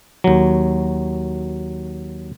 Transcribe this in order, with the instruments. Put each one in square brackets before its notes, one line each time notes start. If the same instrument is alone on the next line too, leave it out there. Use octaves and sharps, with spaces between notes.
[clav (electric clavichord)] D#2 F#3